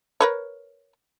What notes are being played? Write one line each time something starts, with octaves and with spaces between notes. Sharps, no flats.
A#4 B4 C#5